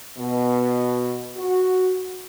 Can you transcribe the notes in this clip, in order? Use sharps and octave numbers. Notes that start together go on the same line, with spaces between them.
B2
F#4